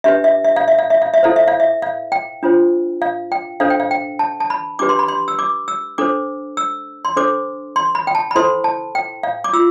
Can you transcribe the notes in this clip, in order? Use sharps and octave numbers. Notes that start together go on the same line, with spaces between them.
D4 G4 B4 E5
E5
E5
F5
E5
F5
E5
F5
E5
E4 A4 C5 F5
E5
F5
E5
F5
G5
D4 F4 C5
F5
G5
D4 A4 C5 F5
G5
F5
G5
A5
A5
B5
D4 G4 B4 D6
C6
B5
C6
E6
D6
E6
D4 A4 C5 D6
E6
C6
D4 A4 C5 D6
C6
B5
G5
A5
B5
E4 A4 C5 C6
A5
G5
F5
D6
F4 E6